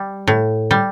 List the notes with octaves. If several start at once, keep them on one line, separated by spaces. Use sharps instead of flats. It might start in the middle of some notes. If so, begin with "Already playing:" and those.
Already playing: G3
A2
G3